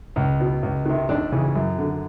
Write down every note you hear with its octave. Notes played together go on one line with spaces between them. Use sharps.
C#2
B2
C#2
C3 D#3
D#2 D4
C#3 E3
F#2
D3